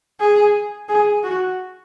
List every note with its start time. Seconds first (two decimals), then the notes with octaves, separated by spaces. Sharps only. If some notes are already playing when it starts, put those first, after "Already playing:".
0.20 G#4
0.89 G#4
1.24 F#4